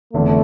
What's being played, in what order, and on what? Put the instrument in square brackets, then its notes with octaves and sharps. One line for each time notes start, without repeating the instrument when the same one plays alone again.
[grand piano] F1 E2 D3 [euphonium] A3